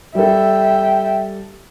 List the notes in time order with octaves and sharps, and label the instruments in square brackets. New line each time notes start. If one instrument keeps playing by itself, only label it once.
[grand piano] G3 A4 [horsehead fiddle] E5 G5